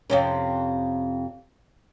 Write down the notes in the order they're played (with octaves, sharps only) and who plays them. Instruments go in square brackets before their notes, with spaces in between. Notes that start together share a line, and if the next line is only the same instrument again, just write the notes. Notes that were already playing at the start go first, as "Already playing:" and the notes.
[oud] F2 C3 C#4